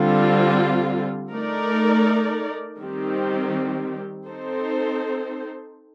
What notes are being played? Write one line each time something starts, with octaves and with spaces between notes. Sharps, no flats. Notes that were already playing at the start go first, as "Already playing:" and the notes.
Already playing: D3 G3 C4 F4
A3 D#4 A#4 D5
D#3 G3 C4 G4
C4 D#4 A4 C5